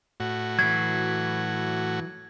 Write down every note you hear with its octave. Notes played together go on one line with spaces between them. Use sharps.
A2 F#4
E3 F#3 G#6